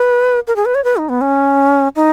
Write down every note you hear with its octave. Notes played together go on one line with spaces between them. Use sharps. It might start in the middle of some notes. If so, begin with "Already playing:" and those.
Already playing: B4
A#4
G#4
B4
C#5
B4
D#4
B3
C#4
D#4